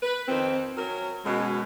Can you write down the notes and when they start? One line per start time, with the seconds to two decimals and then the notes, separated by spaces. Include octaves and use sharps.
0.02 B4
0.28 F2 D#3 C4
0.77 F#3 C#4 A#4
1.24 F#2 B2 G#3